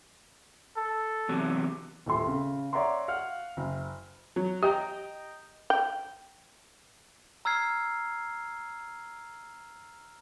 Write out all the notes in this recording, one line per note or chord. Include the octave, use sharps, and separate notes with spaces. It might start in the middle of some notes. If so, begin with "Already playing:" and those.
A4
E2 C3 F#3
D#1 A2 A4 C6
C#3
C#5 D5 E5 F#5 A#5 C6
F5 F#5 F6
F#1
F#3
G4 D#5 G5 A#5
G5
A#5 E6 F6 G#6 C7